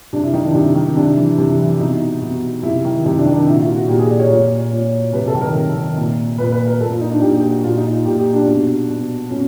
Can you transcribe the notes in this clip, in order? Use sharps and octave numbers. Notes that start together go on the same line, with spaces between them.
C3 D4
E4
D#3 D#4
D4
C3
D#3
C3 D4
E3
C3
E3
B2 D#4
B2
C3 E4
D#3
C3 D#4
D4
D#3
D4
A#2 E4
F#4
F4
F#4
A#2 G4
G#4
D5
C#5
A#2
A#2
C3 B4
A4
D#3
A#4
C3
D#3
A#2
A#2 B4
B4
A#4
A#2 A4
F4
D#4
D4
A#2 G4
G4
F#4
A#2 F4
D#4
F4
A#2 G4
G4
D4
B2
B2
B2 C#4